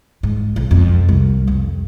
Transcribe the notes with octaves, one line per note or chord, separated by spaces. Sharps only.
G#2
B1
F2
C2
F2